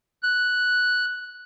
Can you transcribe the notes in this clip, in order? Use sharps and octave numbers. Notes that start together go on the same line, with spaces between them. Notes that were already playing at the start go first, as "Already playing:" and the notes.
F#6